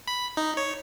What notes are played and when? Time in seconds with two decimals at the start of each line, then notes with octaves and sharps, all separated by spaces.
0.08 B5
0.37 D#4
0.57 C#5